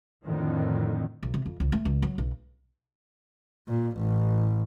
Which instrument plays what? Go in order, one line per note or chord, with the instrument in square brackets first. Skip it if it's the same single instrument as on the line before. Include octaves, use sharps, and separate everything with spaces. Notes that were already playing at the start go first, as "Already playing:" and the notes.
[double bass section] F2 A2 D3 D#3
[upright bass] B1
C3
F2
C#2
A3
C#2
F#3
B1
[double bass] A#2
A1